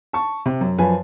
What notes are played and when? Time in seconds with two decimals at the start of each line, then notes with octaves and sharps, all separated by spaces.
0.13 A5 C#6
0.46 C3
0.61 F#2
0.78 F#2 F3 B4 G#5